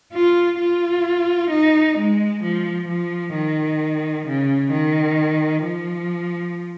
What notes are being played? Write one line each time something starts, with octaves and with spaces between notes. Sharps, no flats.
F4
F4
D#4
G#3
F3
F3
D#3
C#3
D#3
F3